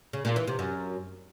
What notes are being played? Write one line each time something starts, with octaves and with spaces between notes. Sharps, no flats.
C#3
A#2
E3
C3
F#2